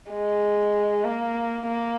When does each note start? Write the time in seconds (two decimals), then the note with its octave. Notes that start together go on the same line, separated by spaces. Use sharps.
0.10 G#3
1.04 A#3
1.67 A#3